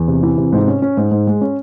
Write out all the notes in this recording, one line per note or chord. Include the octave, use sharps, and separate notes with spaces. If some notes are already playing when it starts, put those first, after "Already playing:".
Already playing: E2
C3
E3
C3
G#2
C#4
C#4
G#2
G#2
G#3
C#4